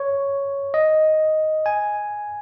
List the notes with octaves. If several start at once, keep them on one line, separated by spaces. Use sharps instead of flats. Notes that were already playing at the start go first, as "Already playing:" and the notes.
Already playing: C#5
D#5
G#5